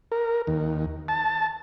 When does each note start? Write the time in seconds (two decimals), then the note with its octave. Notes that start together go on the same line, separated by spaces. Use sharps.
0.12 A#4
0.47 D#2
1.08 A5